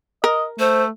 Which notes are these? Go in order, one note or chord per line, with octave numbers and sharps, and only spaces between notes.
A#4 D#5
A3 C5